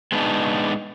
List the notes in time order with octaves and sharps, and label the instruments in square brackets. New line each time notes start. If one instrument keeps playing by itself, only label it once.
[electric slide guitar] G#3 B3 D4 D#4